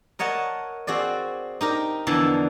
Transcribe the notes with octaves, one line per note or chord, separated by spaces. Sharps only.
A#4 C#5 D#5 F#5 A5
C4 F#4 G#4 D5
D#4 G4 A#4
E2 D3 E3 F3 A5